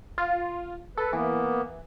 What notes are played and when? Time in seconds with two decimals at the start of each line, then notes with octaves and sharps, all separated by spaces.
0.18 F4
0.97 A4 B4
1.13 E3 A#3 B3